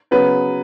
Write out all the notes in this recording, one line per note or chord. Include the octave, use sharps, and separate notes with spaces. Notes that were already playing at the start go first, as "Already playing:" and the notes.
C#3 F#3 B3 B4